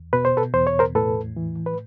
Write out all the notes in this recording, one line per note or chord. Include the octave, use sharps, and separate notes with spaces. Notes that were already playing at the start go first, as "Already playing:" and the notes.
Already playing: E2
B2 B4
C5
A4 B4
E2 C5
C#5
A#4 C5
A2 A4 B4
E3
B4